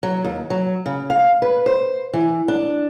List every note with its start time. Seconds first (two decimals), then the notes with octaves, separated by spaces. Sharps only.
0.03 F#3
0.24 D#2
0.50 F#3
0.86 C#3
1.10 F5
1.42 B4
1.66 C5
2.13 E3
2.48 D4